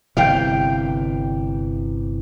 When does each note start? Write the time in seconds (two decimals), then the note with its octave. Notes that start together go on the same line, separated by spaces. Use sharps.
0.17 G1 C3 E3 F5 G5 G6